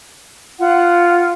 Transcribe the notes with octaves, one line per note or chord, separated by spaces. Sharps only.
F4 F#5